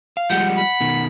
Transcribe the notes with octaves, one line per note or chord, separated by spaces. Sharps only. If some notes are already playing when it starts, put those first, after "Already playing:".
F5
F3 G3 G#3 F#5 G6
B5
B2 D#3